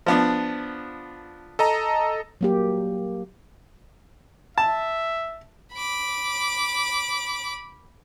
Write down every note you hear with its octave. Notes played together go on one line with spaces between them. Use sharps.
F3 B3 D4
A4 D#5 A#5
F#3 A#3 G4
E5 A5
B5 D6